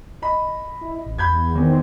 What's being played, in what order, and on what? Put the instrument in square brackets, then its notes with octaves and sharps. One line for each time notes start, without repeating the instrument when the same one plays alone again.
[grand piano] D#5 B5
[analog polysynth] E4
A1
[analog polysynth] E2 [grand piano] B5 G6 G#6
[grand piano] E2 [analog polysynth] D#3 C4